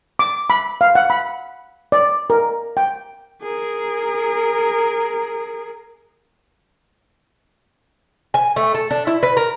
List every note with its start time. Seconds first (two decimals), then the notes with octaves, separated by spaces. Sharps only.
0.19 D6
0.50 B5
0.81 F5
0.95 F#5
1.10 B5
1.92 D5
2.30 A#4
2.77 G5
3.42 G#4 A#4
8.34 G#5
8.56 A3
8.75 A4
8.91 D4
9.07 E4
9.23 B4
9.37 A#4